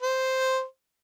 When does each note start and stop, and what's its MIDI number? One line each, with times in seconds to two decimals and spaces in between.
0.02 0.64 72